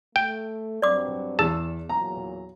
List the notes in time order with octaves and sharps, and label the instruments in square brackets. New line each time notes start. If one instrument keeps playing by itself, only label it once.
[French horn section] A3 [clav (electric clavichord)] G5
[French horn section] G2 F#3 C4 [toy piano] D5 D6
[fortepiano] E2 E6 [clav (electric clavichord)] A5
[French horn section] E2 A#2 F#3 [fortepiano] A#5